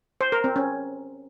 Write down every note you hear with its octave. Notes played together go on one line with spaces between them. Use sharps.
C5
A#4
C4
C#4